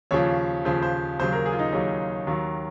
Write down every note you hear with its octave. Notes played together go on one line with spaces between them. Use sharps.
D#2 C#3 F3 C#5
D#2 C#3 F3 C5
C5
D#2 C#3 F#3 C5
A#4
G#4
F4
D#4
D#2 C#3 F#3 C#4
D#2 D#3 F#3